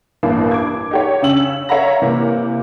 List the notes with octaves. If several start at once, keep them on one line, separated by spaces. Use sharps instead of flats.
A1 G2 B2 E3 A#3
D6 G#6
D#4 G4 C#5
C#3 C#4 E6 F#7
C#5 E5 F5 A#5 A#6
C3 E3 A#3